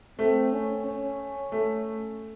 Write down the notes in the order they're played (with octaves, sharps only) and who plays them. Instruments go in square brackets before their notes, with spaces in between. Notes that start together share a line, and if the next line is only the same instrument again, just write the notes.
[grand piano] A3 [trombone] C4
[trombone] C#4
C#4
[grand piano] A3